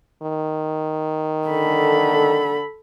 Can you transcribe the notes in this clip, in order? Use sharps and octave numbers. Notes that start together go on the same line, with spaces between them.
D#3
D3 A4 B5